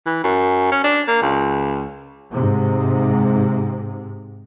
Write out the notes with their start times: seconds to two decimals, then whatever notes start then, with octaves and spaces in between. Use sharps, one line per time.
0.06 E3
0.24 F#2
0.72 C#4
0.84 D4
1.07 A#3
1.22 C#2
2.32 G#2 C3